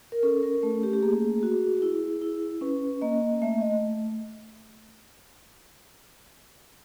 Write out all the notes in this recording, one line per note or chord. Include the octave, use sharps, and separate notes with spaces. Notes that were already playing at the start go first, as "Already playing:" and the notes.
A#4
C#4 A4
A#4
A3 A4
G4
G4
A#3 G#4
F#4
E4
E4
C#4 B4
A#3 D#5
A3 E5
D#5